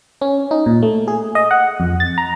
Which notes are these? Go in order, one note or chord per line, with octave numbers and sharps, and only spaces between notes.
C#4
D#4
A#2
A3
G#4
D#5
F#5
F2
A6
A#5